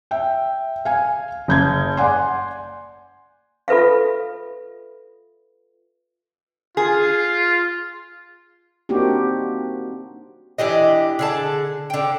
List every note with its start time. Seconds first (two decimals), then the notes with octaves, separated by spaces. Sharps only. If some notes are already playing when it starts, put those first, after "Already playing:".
0.11 E5 G5
0.85 F5 G#5
1.48 F#1 G6 G#6
1.97 D5 F#5 G#5 C6
3.68 F4 A4 B4 E5 F5
6.77 F4 G#4
8.89 A#3 C4 D4 D#4 F#4 G4
10.58 E3 D4 G4 D#5
11.19 D3 G#4 A5
11.90 D3 G5